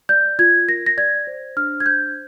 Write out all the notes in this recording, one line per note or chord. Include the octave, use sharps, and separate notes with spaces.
D5 G6
F4 G#6
A#4 A#6
A#6
D5 G#6
C5
D4 F6
G#6
C5 G6